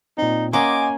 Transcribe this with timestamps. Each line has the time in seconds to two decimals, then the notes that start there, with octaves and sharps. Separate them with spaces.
0.18 A#2 C4 D#4
0.53 A#3 C#4 D#5 F#5 G#5 C6 D6